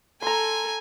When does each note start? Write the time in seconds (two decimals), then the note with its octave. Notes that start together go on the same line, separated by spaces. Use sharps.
0.22 A4 G#5 A#5 C6